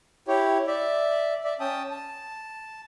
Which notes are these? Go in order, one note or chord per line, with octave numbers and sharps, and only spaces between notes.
E4 G4 C#5
D5 E5
D5 E5
C#4 G5 A5 D#6
A5